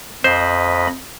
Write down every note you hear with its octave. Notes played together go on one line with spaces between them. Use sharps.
F2 C5 D#5 B5